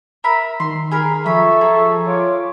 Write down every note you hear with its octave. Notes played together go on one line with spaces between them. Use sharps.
A#4 E5 A#5 B5
D#3 C6
G#4 A#4 B5
F3 A4 E5 B5 C#6
G#4 A#5
F4 C#5 C6 D6